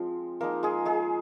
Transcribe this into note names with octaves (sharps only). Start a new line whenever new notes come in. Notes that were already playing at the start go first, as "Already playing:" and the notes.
Already playing: F3 G#3 C4
F3 G#3 A#3 D#4 A#4
G#3 G#4
G#3 G#4